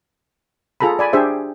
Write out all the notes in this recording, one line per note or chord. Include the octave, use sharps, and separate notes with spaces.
F4 G#4 A4 A#5 B5
D5 G#5 B5
D4 G4 G#4 C5 E5